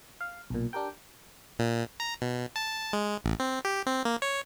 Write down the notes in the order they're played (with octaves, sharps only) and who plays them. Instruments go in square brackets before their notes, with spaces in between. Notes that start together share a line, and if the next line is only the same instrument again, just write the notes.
[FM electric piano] F5
B1 A#2
D4 G4 A#4 G5
[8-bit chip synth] A#2
A#5
B2
A5
G#3
A1
C4
G4
C4
A#3
C#5